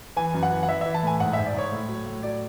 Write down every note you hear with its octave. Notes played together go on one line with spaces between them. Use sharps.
E3 G#5
F#2
F#5
E3
F#5
E3 E5
E3 E5
A5
A2 G#5
G#2 F#5
G#2 E5
D5
G#2 C#5
A2
F#3
A2
F#3 D5